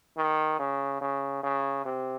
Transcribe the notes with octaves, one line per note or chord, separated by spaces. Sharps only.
D#3
C#3
C#3
C#3
C3